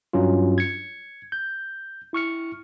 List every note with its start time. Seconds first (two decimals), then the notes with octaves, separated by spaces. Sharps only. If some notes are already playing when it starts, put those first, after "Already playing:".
0.13 G2 F#3 C#4 F4
0.58 G#6 C#7
1.32 G6
2.13 E4 C#6 F6 C#7